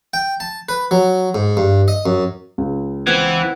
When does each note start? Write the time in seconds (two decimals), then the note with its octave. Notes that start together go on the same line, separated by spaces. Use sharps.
0.14 G5
0.40 A5
0.69 B4
0.91 F#3
1.35 G#2
1.57 G2
1.88 D#5
2.06 F#2
2.58 C#2
3.07 E3 B3 C4 B4